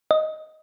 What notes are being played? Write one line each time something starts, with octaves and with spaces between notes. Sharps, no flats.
D#5